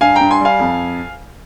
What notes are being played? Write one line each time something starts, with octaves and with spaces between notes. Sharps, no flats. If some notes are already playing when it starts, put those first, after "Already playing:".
G2 F5 G#5
G2 G5 A#5
G#5 C6
G3 F5 G#5
F2